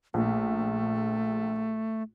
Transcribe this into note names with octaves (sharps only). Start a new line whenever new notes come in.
A#1 A3